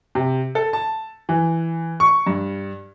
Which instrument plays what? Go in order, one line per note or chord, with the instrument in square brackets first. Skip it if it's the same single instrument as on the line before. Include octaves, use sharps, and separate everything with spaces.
[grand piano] C3
A4
A5
E3
C#6
G2